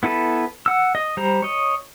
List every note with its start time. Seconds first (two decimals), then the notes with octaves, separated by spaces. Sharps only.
0.03 B3 E4 A4 B4
0.66 F#5 E6
0.95 D#5
1.17 G3 C5 A#5
1.42 C#5 D#5